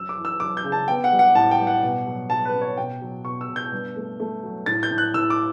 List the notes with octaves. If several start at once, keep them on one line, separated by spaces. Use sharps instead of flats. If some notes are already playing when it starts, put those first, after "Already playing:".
Already playing: F#2 E6
D6
E3
E6
F#2 D6
G6
C#3
A5
B3 G5
F#5
G3
F#5
A2 A5
G5
G3
F#5
B2
F#3
F#3 A5
B4
C#4
C#5
B2 G5
F#3
B2 C#6
E6
B2
G6
G2
A3
A3
F#3
A2 A6
G6
A2
F#6
A2 E6
D6